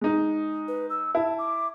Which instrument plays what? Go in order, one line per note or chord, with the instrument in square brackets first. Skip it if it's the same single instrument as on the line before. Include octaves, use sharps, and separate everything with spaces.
[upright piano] G#3 D#4
[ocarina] B4
E6
[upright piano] E4 [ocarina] A5
[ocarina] D6